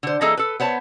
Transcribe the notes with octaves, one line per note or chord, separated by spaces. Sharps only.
D3 C5
E3 A#3 G#4 A4 D#5 A#5
A4 B4
B3 C5 C#5 A5